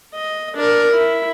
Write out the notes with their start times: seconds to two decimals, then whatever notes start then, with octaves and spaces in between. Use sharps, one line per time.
0.14 D#5
0.56 D4 A#4
0.92 E4